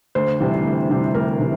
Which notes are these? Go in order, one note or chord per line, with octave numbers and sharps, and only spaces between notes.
D2 C5
C3 E3 G3
D2
C3 E3 G3
D2 A#4
C3 E3